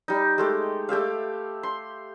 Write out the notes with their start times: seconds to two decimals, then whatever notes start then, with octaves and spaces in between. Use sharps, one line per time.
0.08 G3 D#4
0.38 G#3 A3 G4
0.89 A3 G4 E5 F5
1.63 C6